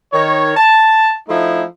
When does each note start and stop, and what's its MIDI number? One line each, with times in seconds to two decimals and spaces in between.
0.12 0.52 51
0.12 0.52 73
0.56 1.13 81
1.28 1.63 53
1.28 1.63 57
1.28 1.63 63
1.28 1.63 64